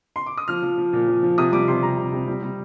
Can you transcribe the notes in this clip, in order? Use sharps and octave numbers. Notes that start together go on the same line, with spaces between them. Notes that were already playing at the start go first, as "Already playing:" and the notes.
C6
D6
D#6
F3 F6
F3
F3
A#2
F3
F3
C3 D#6
G3 D6
C3 C6
C3 A#5
C3
C3
G3
G3